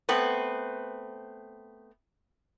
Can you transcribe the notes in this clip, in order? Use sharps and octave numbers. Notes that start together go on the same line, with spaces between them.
A3 B3 C4 B4